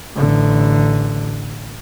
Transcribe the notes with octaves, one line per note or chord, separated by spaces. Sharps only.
A1 D3